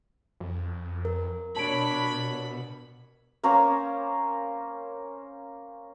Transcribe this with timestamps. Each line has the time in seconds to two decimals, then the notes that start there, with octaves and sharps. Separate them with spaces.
0.40 F2
1.05 A#4
1.56 B2 D4 C#5 A5 B5 D7
3.43 A#3 C#4 A#4 C5